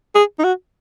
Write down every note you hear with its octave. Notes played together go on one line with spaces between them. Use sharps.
G#4
D#4
F#4